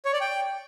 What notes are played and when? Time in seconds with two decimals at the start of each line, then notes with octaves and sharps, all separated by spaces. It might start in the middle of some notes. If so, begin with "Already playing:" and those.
0.05 C#5
0.13 D5
0.21 G5